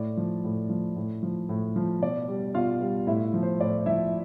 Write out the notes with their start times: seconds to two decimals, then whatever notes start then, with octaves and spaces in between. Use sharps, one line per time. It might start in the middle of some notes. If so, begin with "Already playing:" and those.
Already playing: A2 D5
0.17 F3
0.44 A2
0.69 F3
0.96 A2
1.23 F3
1.49 A2
1.76 F3
2.02 B2 D5
2.29 G3
2.54 B2 F4 F5
2.81 G3
3.07 A2 E4 E5
3.34 F3
3.43 C5
3.60 A2 D5
3.86 F3 E4 E5